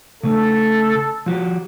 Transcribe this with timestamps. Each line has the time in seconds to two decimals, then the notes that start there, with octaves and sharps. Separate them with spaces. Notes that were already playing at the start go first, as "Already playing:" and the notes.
0.23 C#3 A3 A4
1.26 F3 F#4 G4